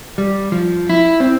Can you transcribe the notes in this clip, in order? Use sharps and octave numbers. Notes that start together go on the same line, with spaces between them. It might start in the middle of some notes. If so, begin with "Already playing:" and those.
G3
F3
E4
C4